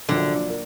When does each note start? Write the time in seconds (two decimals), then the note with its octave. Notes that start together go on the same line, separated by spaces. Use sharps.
0.09 A#1 A#2 D3 F#3
0.49 A#3